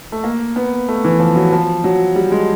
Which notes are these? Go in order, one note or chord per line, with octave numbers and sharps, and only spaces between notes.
A3
A#3
B3
A3
E3
F3
F#3
F3
F#3
G3
G#3